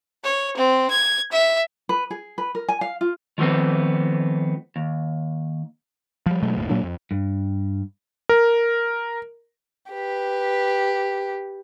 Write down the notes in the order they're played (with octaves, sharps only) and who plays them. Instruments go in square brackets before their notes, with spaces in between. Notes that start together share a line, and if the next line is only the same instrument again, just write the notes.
[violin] C#5
C4
G#6
E5
[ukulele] B4
G#4
B4
A#4
G#5
F5
F4
[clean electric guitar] D#3 F3 A3 B3 C4
D#2
[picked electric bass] F3 G3
B2 F#3 G#3 A3
G1 D#2 A2
A#2 F#3 A#3 D4
F2
[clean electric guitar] G2
[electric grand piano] A#4
[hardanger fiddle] G4 B4